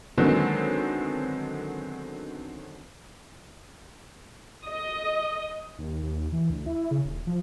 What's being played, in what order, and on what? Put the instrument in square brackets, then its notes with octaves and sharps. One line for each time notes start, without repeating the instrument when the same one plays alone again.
[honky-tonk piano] D3 D#3 F#3 G#3 B3 C4
[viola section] D#5
[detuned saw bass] D#2
D#2
E3
D2
E4
C#3
D#1
F3